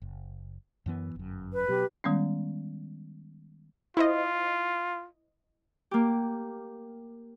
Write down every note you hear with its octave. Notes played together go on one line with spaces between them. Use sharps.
F#1
F#2 E3 B3
G1 F#2
B4
B2 F#3 G4
D#3 G3 G#3 B3 C#4
E4 F4 C5 D#5
A#3 G4